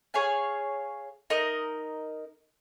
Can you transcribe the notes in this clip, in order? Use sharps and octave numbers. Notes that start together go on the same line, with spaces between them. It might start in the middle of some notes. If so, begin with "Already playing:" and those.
G#4 C#5 F5 G#5
D#4 A#4 D#5